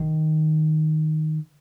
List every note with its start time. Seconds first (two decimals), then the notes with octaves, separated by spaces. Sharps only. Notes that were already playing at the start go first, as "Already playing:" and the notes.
Already playing: D#3